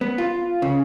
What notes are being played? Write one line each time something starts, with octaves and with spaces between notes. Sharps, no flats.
B3
F4
C#3